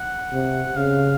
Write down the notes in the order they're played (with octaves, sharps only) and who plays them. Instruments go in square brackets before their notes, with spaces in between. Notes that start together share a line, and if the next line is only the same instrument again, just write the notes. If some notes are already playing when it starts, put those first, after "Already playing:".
Already playing: [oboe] F#5
[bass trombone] C3
[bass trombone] C#3 [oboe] F5